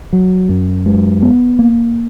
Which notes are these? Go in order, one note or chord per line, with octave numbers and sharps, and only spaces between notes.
F#3
F#2
G#3
B3
A#3